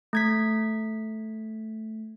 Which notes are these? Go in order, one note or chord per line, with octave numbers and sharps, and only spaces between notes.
A3 G#6 B6